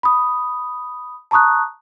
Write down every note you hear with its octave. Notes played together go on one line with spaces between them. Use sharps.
B5 D#6
A5 A#5 C#6 D#6 F#6